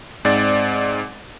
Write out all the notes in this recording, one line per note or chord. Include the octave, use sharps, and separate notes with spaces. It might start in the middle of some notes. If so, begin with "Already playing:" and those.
G#2 C4 D5 A6